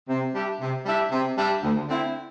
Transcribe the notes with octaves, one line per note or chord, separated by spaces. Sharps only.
C3
G3 D4 G4 E5
C3
G3 D4 G4 E5
C3
G3 D4 G4 E5
D2
D3 C4 E4